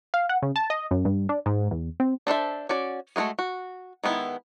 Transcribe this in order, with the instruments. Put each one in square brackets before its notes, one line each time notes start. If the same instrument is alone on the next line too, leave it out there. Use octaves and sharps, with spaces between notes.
[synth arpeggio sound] F5
F#5
C#3
A5
D#5
F#2
G2
D4
G#2
E2
C4
[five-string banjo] D4 A4 C5 E5
C#4 F#4 D5
G#3 A3 F4 F#4 G#4
F#4
D#3 G#3 B3 E4